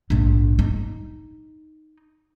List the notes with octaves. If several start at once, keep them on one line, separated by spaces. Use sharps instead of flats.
A#1 G#2
D#4